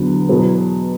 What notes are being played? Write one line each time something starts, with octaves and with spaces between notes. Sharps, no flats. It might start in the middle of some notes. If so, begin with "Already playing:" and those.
Already playing: E2 D3 F#3 B3
E2 B2 F#3 B3